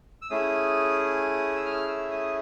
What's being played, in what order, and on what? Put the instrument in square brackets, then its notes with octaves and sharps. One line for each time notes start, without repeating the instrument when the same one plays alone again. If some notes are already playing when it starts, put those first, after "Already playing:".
[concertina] E6
A3 C#4 E4 G#4 D#6
E6
F6
E6
D#6